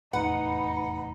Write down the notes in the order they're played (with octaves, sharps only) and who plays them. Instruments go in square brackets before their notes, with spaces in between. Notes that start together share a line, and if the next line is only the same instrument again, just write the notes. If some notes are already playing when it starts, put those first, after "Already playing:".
[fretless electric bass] F1 E2 A2 [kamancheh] D#4 [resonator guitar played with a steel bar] B4 [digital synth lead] F#5